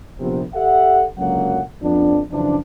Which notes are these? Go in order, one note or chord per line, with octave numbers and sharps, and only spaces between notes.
A#1 C3 B3
G4 A4 E5 F#5
C#2 F#2 D3 F#3 A#3 F#5
F2 F3 B3 D4
F#2 C#3 E3 F3 D4